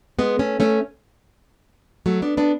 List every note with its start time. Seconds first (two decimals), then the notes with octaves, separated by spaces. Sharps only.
0.19 G#3 B3
0.39 A3 C#4
0.60 A3 C#4
2.06 F#3 A3
2.22 B3 D4
2.37 B3 D4